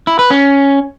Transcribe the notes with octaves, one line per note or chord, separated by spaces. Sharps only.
E4
B4
C#4